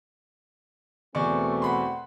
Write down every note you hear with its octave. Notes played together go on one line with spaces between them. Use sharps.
E2 B2 A3 C4 D5 C#6
F#5 B5 C6